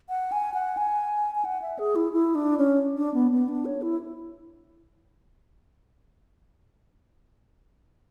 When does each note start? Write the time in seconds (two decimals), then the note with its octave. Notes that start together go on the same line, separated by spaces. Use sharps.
0.09 F#5
0.32 G#5
0.54 F#5
0.77 G#5
1.35 G#5
1.45 F#5
1.62 E5
1.79 G#4
1.96 E4
2.13 E4
2.35 D4
2.58 C#4
2.97 D4
3.14 B3
3.31 B3
3.48 D4
3.65 C#5
3.82 E4